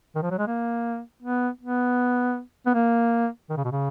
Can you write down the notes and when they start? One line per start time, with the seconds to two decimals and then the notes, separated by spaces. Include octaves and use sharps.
0.15 D#3
0.22 F3
0.30 F#3
0.38 G#3
0.47 A#3
1.22 B3
1.61 B3
2.66 B3
2.74 A#3
3.49 D#3
3.57 C#3
3.64 B2
3.71 C#3